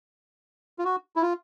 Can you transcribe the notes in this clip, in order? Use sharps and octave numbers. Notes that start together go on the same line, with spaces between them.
F4
F#4
E4
F4